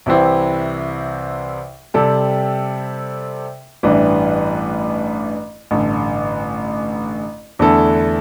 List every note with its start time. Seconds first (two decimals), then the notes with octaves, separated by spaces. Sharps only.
0.06 C2 C3 E3 C4 E4
1.94 C3 G3 C4 A4
3.83 A1 G2 E3 G3
5.71 A1 G2 D3
7.59 E2 D3 A3 E4 A4